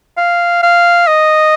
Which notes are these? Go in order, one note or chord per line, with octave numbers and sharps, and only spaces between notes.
F5
F5
D#5